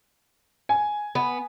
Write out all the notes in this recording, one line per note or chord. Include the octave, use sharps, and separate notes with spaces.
G#5
B3